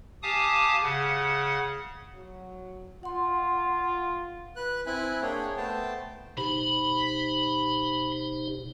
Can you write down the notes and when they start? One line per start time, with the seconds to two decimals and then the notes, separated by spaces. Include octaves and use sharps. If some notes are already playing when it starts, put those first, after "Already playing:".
0.23 G4 F5 G#5 A5 D6 D#6
0.83 C#3 F#5
2.16 F#3
3.03 F4 F#5 C6
4.56 B4 F#6
4.86 C4 E4 G#5 B5 F#6
5.22 A#3 D4 G#4 C#5 G5
5.57 A3 B3 C5 G5 A5
6.37 B2 D#4 G4 C5 B5